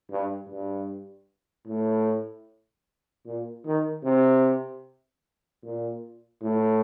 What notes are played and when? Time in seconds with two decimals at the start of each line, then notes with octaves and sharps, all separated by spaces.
0.10 G2
0.49 G2
1.67 A2
3.26 A#2
3.65 D#3
4.04 C3
5.63 A#2
6.42 A2